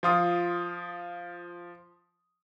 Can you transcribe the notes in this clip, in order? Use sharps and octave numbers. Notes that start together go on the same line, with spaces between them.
F3 F4 D#6